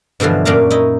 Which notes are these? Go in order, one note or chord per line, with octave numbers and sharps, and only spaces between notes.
G2 B2 D3 E3 F3
F#2 A#2 C#4 D4 F5 A#5
D#4 E4 D#5